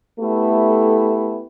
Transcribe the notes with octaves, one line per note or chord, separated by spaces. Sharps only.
A3 B3 E4 G4 A4